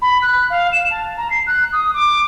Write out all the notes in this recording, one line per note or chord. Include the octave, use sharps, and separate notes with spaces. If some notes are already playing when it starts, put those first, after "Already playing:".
B5
F#6
F5
E7
A5
A#5
C7
F#6
D#6
D6